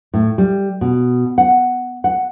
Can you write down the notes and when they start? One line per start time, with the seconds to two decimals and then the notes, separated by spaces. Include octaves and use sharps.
0.14 A2
0.38 G3
0.81 B2
1.38 F#5
2.04 F#5